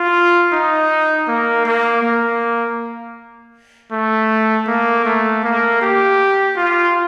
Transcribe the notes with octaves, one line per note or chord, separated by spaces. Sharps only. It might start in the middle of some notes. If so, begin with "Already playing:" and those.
Already playing: F4
D#4
A#3
A#3
A#3
A3
A#3
A3
A#3
G4
F4